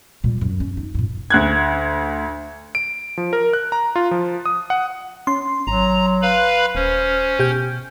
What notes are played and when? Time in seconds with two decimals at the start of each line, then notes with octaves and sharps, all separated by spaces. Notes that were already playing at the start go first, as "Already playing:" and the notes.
0.24 A#2 G3
0.41 F#2
0.60 C#4
0.77 D#4
0.95 G2 A#2
1.30 D2 F#6 G#6
2.75 D7
3.18 F3
3.33 A#4
3.53 F#6
3.72 A#5
3.96 F4
4.11 F3
4.46 D#6
4.70 F#5
5.27 C#4 C6
5.67 G#1 F#3 A#5
6.22 B4 F5 B5
6.75 D#1 C#4 C5
7.39 B2 G4 G6